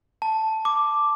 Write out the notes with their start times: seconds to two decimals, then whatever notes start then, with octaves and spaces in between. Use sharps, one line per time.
0.22 A5
0.65 D6